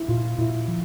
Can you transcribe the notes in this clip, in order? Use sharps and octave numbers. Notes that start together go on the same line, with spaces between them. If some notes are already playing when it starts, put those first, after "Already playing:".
Already playing: E4
A#2 F4
A#2 E4
F3